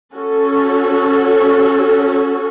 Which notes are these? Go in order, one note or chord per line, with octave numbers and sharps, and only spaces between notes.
C#4 F#4 A4